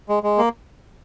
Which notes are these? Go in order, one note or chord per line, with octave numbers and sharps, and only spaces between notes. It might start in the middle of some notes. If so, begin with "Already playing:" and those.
G#3
G#3
A#3